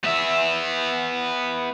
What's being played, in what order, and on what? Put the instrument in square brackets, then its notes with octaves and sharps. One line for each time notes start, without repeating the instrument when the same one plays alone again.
[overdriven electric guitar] B3 E5